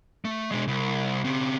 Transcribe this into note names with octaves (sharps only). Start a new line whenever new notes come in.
A3
B2 G#3
C2
C#3 C4